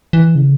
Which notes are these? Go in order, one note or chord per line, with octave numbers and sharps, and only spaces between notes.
E3
C#3